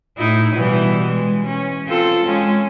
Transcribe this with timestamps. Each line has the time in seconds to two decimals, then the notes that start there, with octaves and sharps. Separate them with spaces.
0.17 A2 D#4 E4
0.54 B2 E3 G3
1.06 G#3
1.46 C#4
1.87 C4 F4 A4
2.25 G#3 C#4